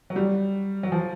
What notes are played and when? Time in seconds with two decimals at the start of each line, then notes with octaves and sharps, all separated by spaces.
0.10 F#3
0.16 G3
0.83 F#3
0.92 F3